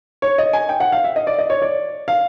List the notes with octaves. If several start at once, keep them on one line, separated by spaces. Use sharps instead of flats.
C#5
D#5
G#5
G5
F#5
F5
E5
D#5
D5
D#5
C#5
D5
F5